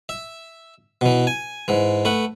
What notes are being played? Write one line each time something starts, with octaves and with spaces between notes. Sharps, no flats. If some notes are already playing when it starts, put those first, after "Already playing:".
E5
B2 E3
G#5
G#2 E3
A3 B4 F#5